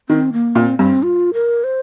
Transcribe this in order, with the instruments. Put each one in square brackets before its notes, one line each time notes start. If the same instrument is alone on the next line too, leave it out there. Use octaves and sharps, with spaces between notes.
[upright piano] D#3 [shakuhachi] C4
[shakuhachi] A#3
[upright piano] A#2 [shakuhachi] C4
[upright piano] G2 [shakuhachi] C4
[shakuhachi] F4
A#4
C5